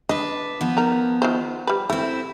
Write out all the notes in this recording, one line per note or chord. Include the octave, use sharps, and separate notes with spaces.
D4 B4 D#5
F3 B3
D#4 A#4
D#3 F4 C5
G3 B4
A3 C4 E4